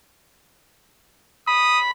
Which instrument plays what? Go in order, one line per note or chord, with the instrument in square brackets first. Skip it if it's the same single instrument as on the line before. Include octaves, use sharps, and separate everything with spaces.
[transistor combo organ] B5 [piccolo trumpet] D#6